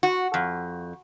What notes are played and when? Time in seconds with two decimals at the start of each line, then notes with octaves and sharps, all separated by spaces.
0.03 F#4
0.34 F2